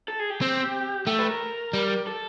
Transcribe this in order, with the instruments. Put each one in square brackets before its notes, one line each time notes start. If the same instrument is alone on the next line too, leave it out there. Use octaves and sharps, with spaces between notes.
[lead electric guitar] A4
G#4
G4
[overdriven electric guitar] C4
[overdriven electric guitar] A3 [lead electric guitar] G4
[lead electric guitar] B4
A#4
[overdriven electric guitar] G3
[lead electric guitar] A4